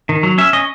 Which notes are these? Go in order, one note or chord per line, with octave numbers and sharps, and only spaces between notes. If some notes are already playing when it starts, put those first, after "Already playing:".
D#3
F#3
C#4 E5
C#4 D#5